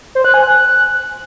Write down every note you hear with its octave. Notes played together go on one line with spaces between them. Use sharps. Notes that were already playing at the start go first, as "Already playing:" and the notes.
C5
F#6
G#5
F#6